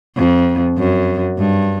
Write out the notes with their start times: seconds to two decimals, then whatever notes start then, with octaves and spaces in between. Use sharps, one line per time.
0.17 F2
0.78 F#2
1.39 G2